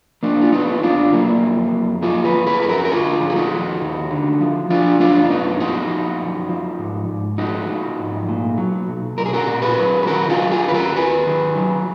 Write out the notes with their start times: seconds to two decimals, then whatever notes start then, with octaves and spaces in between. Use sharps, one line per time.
0.23 F3 A#3 D4
0.42 F4
0.52 F3 B3 D#4
0.83 F2 D4 F4
1.12 F3 F#3 A#3
1.43 F2
1.72 F2
2.02 F3 F4 G#4
2.24 G#4 B4
2.32 F3
2.47 G#4 B4
2.62 F2 G#4
2.69 F#4 A#4
2.85 A#4
2.91 D3 F4 G#4
3.21 F3
3.30 G#4
3.36 D#4 F#4
3.52 D#2
3.81 D#2
4.10 D3
4.41 F3
4.70 F3 D4 F4
5.00 F#2 D4 F4
5.25 D4
5.30 F#2 B3 D#4
5.60 F3 D#4 F#4
5.90 F3
6.20 F#2
6.49 F3
6.79 G#2
7.08 G#2
7.38 F3 D#4 F#4
7.69 F3
7.99 G#2
8.28 A#2
8.58 F#3
8.88 B1
9.17 B1 A#4
9.26 G#4
9.33 F#4 A#4
9.47 A#2
9.62 G#4 B4
9.77 F#3
10.03 B4
10.07 D#3 F#4 A#4
10.29 F4 G#4
10.37 F#3
10.51 F4 G#4
10.67 D#2 B4
10.74 F#4 A#4
10.96 D#2 G#4 B4
11.27 D#3
11.56 F#3